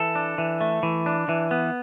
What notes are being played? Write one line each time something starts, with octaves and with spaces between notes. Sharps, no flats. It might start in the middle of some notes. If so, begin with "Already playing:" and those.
Already playing: E3 A4
D4
E3
A3
E3
D4
E3
B3